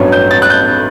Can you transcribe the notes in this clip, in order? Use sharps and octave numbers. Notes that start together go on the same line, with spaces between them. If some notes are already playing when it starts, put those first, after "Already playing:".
Already playing: A1 G2 F#3 B3
G6
A6
F#6
G6